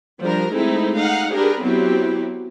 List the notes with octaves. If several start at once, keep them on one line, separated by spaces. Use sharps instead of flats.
F3 G3 D4 A#4
G#3 A3 C4 D#4 E4
D#4 F5 F#5
D4 G4 G#4 A#4 B4
F#3 B3 C4 E4 G4